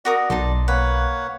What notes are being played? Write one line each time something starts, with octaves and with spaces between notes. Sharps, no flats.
F#4 A#4 D5 D#6
B1 D#4 A5 C6
A#3 B4 C#5 F#5